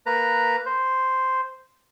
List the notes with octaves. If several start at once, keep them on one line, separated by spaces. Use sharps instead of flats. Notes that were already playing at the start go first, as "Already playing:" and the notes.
A#3 B4 A#5
C5